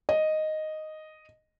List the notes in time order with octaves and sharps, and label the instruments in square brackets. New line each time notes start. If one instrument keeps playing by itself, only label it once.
[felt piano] D#5